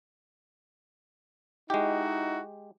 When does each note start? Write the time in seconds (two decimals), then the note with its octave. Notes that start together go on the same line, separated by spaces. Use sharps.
1.70 G#3 D#4 E4 F#4 G4